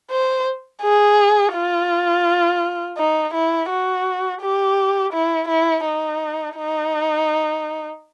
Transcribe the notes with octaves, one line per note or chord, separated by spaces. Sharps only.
C5
G#4
F4
D#4
E4
F#4
G4
E4
E4
D#4
D#4